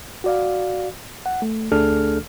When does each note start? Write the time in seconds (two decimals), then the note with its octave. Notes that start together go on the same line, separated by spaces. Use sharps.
0.24 F#4 D5 F5
1.26 F#5
1.42 A3
1.72 D2 A3 D4 G#4 A4 F6